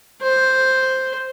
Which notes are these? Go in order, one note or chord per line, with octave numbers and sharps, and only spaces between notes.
C5